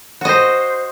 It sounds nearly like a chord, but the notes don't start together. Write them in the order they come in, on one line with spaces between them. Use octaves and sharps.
F#4 D#5 C5